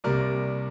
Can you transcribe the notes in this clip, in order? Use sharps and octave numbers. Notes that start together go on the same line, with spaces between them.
C2 C3 G3 A#3 A#4 D5